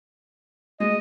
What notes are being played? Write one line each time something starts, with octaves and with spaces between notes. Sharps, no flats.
G#3 D#5